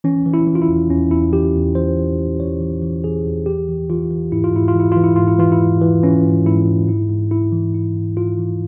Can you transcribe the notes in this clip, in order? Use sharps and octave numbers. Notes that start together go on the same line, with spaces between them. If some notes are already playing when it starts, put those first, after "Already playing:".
E3 C#4
E3
E4
E3
F4
E4
E2
E2 C#4
E2 E4
E3 G4
E2
E3 C5
E3
E3
E3 C#5
E3
E3
E3 G#4
E2
E3 G4
E3
E3 F4
E3
G#2 E4
F4
G#2 E4
F4
E3 E4
E3 F4
E4
G#2 F4
E4
E3 F4
E4
G#2
E3
E3 C#4
G#2
G#2 E4
G#2
G#2 E4
G#2
G#2 E4
E3
G#2 E4
G#2
G#2 F4
E3